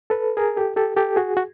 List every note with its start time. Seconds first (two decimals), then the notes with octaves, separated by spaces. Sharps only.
0.10 A4 B4
0.37 G#4 A#4
0.56 G4 A4
0.76 G4 A4
0.96 G4 A4
1.16 F#4 G#4
1.37 F#4